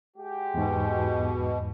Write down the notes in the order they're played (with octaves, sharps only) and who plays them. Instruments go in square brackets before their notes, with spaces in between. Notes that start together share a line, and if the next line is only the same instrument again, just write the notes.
[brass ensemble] G#3 F#4 G4
[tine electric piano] E2 G#2 [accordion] B2